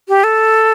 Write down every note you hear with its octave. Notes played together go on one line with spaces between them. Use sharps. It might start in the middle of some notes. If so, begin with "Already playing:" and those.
G4
A4